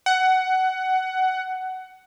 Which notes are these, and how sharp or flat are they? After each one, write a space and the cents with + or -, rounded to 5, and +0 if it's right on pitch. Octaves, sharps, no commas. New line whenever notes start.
F#5 +15